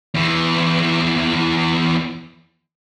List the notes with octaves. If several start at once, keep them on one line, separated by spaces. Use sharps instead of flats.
E2 E3